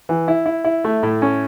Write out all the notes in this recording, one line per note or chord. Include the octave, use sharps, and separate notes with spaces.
E3
E4
E4
E4
A3
A2
C#4